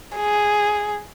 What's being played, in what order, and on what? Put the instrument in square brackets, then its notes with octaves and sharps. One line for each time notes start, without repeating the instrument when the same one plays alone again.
[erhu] G#4